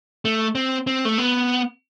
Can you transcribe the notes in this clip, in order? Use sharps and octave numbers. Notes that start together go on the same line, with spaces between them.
A3
C4
C4
A3
B3